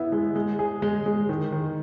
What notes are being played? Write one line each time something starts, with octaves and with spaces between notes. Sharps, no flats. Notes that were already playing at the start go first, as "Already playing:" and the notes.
Already playing: B3 E4
G#3
G#3
G#4
G#3
G#3
D#3
D#3